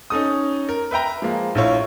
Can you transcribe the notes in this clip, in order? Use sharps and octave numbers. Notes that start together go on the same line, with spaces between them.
C#4 D#4 A4 D#6
A#4
B4 E5 G5 A#5
F3 G#3 A#3
A#1 A3 E4 F4 C#5